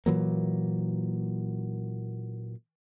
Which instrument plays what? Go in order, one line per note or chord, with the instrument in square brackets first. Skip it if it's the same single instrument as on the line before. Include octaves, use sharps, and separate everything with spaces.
[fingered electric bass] A#2 E3 F#3 A#3